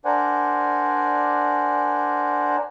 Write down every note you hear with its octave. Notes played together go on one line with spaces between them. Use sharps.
D4 A#4 C5 D5 F#5 G#5